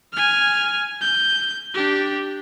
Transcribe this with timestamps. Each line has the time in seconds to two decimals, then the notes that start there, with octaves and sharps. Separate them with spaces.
0.13 G#5 F6
1.01 G6
1.75 D4 G4